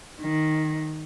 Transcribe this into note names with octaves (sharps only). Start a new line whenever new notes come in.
D#3